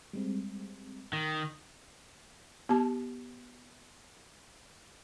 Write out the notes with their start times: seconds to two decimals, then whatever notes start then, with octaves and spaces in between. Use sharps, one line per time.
0.13 G3 G#3 C4
1.13 D#3
2.69 B3 G4 A5